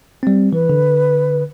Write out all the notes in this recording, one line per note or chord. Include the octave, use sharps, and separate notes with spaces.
G3 C4
E3 B4
D3